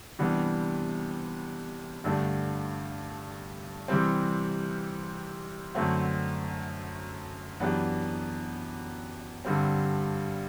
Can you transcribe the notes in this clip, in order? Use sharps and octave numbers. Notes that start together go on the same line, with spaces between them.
C3 E3 G3 B3 D4
G2 D3 A3 D4 G4
C3 E3 G3 C4
F#2 D3 A3 C4 F#4
F#2 E3 B3 D4 G4
G2 D3 G3 C4